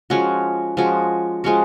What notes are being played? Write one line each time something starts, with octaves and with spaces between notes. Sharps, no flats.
F3 G#3 C#4 F#4
F3 G#3 C#4 F#4
F3 G#3 C#4 F#4